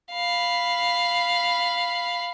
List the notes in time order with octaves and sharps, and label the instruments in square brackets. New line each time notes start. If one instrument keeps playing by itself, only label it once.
[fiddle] F5 B5